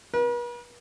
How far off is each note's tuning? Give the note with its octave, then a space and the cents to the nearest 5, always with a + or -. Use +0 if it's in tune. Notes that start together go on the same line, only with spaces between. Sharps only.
B4 -45